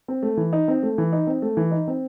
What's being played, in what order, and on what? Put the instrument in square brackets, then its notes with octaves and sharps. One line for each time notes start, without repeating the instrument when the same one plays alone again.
[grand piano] C4
A3
E3
D#4
C4
A3
E3
D#4
C4
A3
E3
D#4
C4